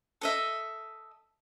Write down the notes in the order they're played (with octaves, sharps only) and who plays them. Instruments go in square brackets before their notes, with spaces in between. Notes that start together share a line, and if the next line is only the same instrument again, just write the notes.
[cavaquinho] A4 D#5 E5